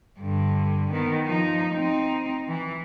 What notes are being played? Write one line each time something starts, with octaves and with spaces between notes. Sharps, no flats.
G2 D3
D#3 B3
F3 D#4
C4 D#4
E3